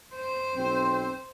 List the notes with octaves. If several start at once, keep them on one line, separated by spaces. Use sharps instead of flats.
C5
B1 C4